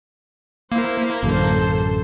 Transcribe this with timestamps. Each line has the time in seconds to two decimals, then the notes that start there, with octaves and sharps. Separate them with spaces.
0.72 A#3 E4 C5
1.22 A1 F#2 D3 A4 C5